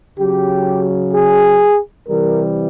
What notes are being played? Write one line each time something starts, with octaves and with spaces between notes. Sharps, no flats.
C#3 F#3 G4
G#4
C3 E3 G3 A#4